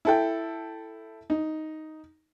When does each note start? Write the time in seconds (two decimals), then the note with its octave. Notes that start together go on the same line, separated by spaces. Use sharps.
0.05 E4 A4 G5
1.30 D#4